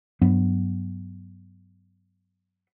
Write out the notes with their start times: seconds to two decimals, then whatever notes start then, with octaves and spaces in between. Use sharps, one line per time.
0.22 G2 F#3 B3